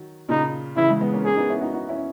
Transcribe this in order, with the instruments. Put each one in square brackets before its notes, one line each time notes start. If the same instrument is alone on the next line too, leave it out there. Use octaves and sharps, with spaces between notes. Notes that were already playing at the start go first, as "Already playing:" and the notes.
Already playing: [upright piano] D#3 F#3
[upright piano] A#2 C#3 [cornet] D#4
[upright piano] C#3 E3 [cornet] E4
[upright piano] E3 G#3
G#3 B3
A#3 C#4
[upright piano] A#3 C#4 [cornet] G#4
[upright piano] B3 D#4
C#4 E4
D#4 F#4
D#4 F#4
C#4 E4